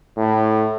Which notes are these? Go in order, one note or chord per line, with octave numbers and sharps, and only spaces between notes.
A2